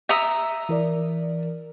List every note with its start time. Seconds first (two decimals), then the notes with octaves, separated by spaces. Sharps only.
0.09 E5 A#5 D#6
0.69 E3 A#4 D5